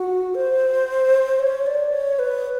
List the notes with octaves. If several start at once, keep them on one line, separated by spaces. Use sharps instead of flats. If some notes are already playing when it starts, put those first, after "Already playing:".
Already playing: F#4
C5
C#5
D5
C#5
B4